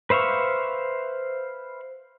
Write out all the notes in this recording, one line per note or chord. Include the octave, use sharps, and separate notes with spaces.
B4 C5 E5 F5 C#6